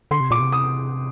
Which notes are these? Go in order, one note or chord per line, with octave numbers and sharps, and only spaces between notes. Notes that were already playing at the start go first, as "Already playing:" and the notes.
D3 C6
C3
A#2 D6
C3
D#6